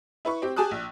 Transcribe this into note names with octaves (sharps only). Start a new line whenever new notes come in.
E4 B4 C#6
C4 G4
G4 G#4 G#5 A5 D#6 F#6
A#1